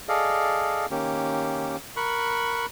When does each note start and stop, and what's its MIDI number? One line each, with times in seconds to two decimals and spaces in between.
0.09 0.86 68
0.09 0.86 69
0.09 0.86 74
0.09 0.86 75
0.09 0.86 77
0.91 1.76 51
0.91 1.76 58
0.91 1.76 61
0.91 1.76 67
1.97 2.66 70
1.97 2.66 83
1.97 2.66 85
1.97 2.66 90